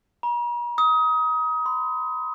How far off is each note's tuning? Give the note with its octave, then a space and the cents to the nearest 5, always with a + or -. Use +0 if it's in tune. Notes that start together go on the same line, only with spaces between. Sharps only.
A#5 +45
D#6 +25
C6 -40